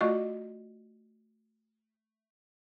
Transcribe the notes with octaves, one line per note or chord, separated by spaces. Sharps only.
A3 F4 F#4 D5 D#5 C#6